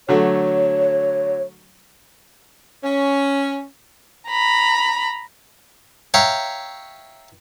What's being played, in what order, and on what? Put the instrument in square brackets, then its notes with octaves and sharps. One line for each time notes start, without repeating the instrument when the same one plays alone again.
[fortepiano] D3 F#3 A3 [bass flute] C#5
[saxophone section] C#4
[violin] A#5 B5
[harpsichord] C#5 E5 F5 G5 A#5